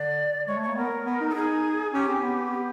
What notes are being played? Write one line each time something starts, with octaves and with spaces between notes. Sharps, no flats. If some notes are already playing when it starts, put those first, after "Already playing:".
Already playing: D3 D5
G#3 C#5
A3
A#3 C#5
B3 A#4
B3
D#4
A4
D#4 G#4
C#4 G4
C4
B3
G#4
G4